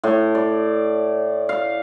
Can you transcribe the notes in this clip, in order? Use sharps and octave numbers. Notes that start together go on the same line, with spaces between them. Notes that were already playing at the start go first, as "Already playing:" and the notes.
A2
D5
F5